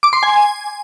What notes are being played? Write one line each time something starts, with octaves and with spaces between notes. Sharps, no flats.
D6
C6
G#5